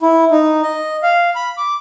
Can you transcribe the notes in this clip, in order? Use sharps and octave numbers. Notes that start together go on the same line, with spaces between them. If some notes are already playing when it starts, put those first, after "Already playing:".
E4
D#4
D#5
F5
B5
D6